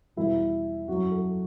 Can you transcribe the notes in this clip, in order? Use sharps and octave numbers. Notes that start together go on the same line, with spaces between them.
E2 B2 G3 E4
F#2 F#3 F#4
A4